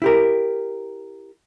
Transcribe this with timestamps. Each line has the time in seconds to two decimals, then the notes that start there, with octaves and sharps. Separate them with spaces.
0.02 E4 G4 A#4